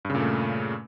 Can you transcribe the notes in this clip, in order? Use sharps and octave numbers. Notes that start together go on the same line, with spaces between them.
G2 A#2 C#3 A3